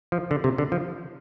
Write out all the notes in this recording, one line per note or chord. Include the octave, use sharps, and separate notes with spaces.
F3
D3
C3
D3
F3